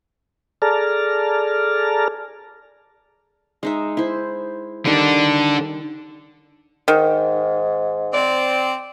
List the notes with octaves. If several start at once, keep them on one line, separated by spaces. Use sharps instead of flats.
G#4 A4 D5 A5 A#5 F6
G#3 D#4 E5
E4 C5
D3 D#3 G3 D4
G#2 D#3
C4 D5